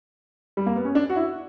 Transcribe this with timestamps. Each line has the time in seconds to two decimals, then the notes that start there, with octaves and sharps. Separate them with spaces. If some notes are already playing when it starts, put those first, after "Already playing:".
0.57 G3
0.66 A#3
0.76 B3
0.85 C#4
0.95 D4
1.10 F#4
1.16 E4